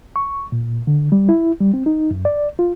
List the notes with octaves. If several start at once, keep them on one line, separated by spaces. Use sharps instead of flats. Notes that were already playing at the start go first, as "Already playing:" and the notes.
C#6
A#2
D3
G3
E4
G3
C4
D#4
F#2
D5
F4